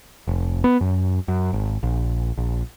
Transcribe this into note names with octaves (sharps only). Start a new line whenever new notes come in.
F1
B3
F#2
F#2
G#1
A#1
A#1